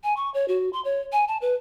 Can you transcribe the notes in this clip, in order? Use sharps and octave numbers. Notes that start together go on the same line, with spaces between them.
G#5
C#6
C#5
F#4
C6
C#5
G#5
A5
B4